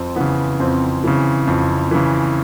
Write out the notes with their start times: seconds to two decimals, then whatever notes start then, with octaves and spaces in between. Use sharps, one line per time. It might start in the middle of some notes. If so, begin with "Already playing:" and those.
Already playing: F2 C4
0.16 C#3 E3 B3
0.60 F2 C4
1.04 C#3 E3
1.47 F2
1.91 C#3 E3